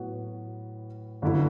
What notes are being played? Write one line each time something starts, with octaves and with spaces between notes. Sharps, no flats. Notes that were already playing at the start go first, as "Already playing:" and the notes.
Already playing: A2 F#3 B3 F#4
G1 F#2 D3 A3 E4